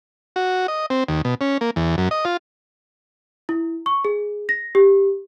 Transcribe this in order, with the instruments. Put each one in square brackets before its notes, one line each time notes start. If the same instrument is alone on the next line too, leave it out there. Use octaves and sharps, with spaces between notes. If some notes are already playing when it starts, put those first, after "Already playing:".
[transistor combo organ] F#4
D#5
C4
D#2
B2
C#4
A#3
E2
F#2
D#5
F4
[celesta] E4
C#6
G#4
A#6
G4